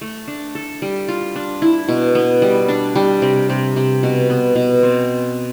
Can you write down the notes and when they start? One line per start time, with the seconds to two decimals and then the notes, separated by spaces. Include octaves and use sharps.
0.01 A3
0.28 D4
0.55 A4
0.82 G3
1.08 F4
1.36 D4
1.62 E4
1.88 B2
2.15 B3
2.42 G3
2.68 D4
2.95 G3
3.22 C3
3.49 C3
3.76 C3
4.03 B2
4.30 B3
4.56 B2
4.83 C4